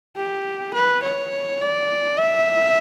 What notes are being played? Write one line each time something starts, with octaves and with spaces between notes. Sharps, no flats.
G4
B4
C#5
D5
E5